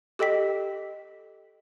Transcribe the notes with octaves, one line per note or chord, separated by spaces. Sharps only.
G4 A4 D#5 G5 B6